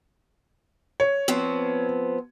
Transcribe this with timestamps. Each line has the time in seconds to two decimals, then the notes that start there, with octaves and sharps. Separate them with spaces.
1.00 C#5
1.28 F3 B3 C4